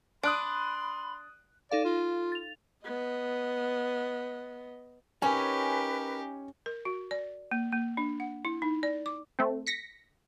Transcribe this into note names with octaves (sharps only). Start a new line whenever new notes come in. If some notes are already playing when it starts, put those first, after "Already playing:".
D4 B5 C6 D#6 F#6 D7
D#4 A4 D5 F5
F4
A6 F7
B3 D#5
C#4 D#4 G4 A#4 B4 G#5
A#4
F#4
D5
A#3
A#3
D4
F#5
E4
D#4
D5
D6
A3 C4
A#6 B6 C#7